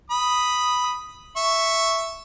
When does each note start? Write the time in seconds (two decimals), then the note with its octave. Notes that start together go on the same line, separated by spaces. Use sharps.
0.11 B5 D#6
1.37 E5 C#6